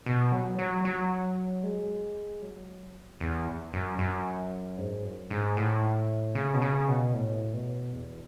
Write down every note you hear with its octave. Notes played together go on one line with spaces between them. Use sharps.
B2
F#3
F#3
F#3
G#3
F#3
E2
F#2
F#2
G#2
F#2
G#2
A2
C#3
B2
C#3
B2
A2
B2
E2